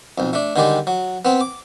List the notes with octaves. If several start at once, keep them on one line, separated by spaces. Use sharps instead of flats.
B1 F2
A3 D4
D3 D#3 G3 G#3 D5
F#3
B3 C4
D6